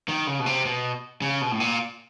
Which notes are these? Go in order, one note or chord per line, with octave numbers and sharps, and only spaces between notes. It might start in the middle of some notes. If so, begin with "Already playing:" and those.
D#3
C#3
B2
C3
B2
C#3
B2
A2
A#2